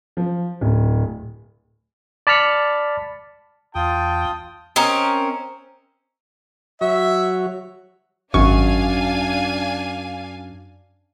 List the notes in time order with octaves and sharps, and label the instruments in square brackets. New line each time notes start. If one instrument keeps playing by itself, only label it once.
[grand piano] F3
D1
[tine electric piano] D5 A5 B5 F6 B6 C#7
[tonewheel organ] E2 [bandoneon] F4 D#6 [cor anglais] G5 [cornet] A5
[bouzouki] C4 C#4 A#4 D#5
[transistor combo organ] F#3 F#4 C#5 [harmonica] E5
[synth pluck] G#1 C#6 [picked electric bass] F#2 [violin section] D4 F5 G#5